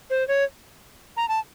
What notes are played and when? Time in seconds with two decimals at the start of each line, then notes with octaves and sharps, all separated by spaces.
0.10 C5
0.28 C#5
1.17 A#5
1.29 A5